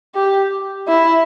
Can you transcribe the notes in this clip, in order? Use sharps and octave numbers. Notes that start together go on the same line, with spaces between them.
G4
E4